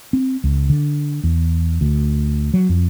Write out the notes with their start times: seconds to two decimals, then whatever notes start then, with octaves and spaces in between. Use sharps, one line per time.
0.13 C4
0.44 C#2
0.70 D3
1.23 E2
1.81 D2
2.54 F#3
2.69 F2